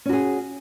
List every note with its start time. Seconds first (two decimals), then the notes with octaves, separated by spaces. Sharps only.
0.05 C#4
0.09 F#4
0.13 G#4